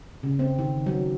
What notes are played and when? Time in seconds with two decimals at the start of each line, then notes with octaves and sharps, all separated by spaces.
0.23 C#3
0.39 C4
0.59 D#3
0.86 F#3